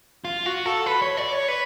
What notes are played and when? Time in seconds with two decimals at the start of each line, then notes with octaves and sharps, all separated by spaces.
0.25 F4
0.46 F#4
0.66 A4
0.86 B4
1.02 C#5
1.17 D5
1.32 C#5
1.48 B4